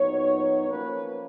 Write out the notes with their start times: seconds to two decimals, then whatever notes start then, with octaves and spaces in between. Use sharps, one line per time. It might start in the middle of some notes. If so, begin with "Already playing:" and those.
Already playing: A#2 F#3 B3 D#4 C#5
0.68 F3 A#3 C#4 B4